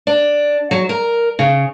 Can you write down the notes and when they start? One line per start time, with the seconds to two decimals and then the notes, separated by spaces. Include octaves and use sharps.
0.07 D4
0.71 F#3
0.89 A#4
1.39 C#3